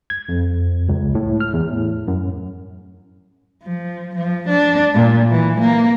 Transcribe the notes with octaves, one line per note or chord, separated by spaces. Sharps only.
G#6
F2
C#2
A2
F6
E2
A2
F#2
F3
F3
D4
A#2
E3
A#3